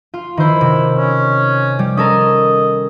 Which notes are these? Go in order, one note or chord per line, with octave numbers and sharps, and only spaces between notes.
F4
D#3 E4 C5
C3
C#4
G3
C#4 A4 A#4 D#5